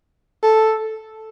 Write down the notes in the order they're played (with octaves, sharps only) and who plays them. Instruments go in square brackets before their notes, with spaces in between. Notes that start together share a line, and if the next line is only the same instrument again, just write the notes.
[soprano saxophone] A4